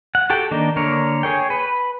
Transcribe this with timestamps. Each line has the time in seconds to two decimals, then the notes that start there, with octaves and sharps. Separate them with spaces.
0.15 F#5
0.30 F#4 G4 A4 G5
0.51 D#3 A#3 D4 D#4
0.76 D3 A#3 A#4 C#5
1.23 G#4 C#5 G5
1.50 B4